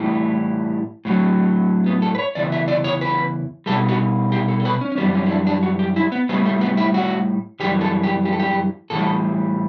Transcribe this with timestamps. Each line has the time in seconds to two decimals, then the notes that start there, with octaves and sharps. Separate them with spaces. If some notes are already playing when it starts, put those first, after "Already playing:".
Already playing: A2 E3 G3 A3
1.05 A2 F#3
1.86 B3
2.02 A4
2.15 B4
2.19 C#5
2.35 E2 C#3 E3 D5
2.52 E5
2.68 D5
2.84 C#5
3.01 B4
3.66 B2 G3 A4
3.88 F#4
4.32 G4
4.48 A4
4.60 A4
4.65 B4
4.81 C#4
4.92 C#4
4.97 F#2 E3 G3 B3
5.14 C#4
5.26 E4
5.31 D4
5.47 D4
5.63 F#4
5.79 G4
5.96 E4
6.12 B3
6.29 A2 G3 B3
6.46 A3
6.61 B3
6.77 E4
6.94 F#4
7.60 F#2 E3 G3 G4
7.81 A4
8.04 G4
8.25 G4
8.33 A4
8.40 G4
8.90 A2 E3 G3 A4